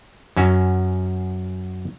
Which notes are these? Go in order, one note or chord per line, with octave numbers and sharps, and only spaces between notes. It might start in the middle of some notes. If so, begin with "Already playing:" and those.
F#2 C#4 F#4